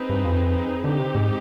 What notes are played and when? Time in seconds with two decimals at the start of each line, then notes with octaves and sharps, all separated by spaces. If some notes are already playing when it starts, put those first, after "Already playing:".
Already playing: C4 D#4 G#4 B4
0.09 G2
0.24 F2
0.84 D3 C4 D#4 G4
0.99 C3
1.15 G#2